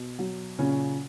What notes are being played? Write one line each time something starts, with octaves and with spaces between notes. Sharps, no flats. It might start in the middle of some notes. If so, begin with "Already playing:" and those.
Already playing: B2
F#3
A#2 C#3 C#4